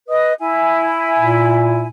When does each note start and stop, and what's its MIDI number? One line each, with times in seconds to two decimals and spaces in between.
0.09 0.33 71
0.09 0.33 75
0.09 0.33 87
0.40 1.86 64
0.40 1.86 80
1.18 1.88 46